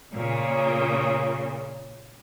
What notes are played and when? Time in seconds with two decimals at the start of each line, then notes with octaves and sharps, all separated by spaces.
0.14 A#2 C#3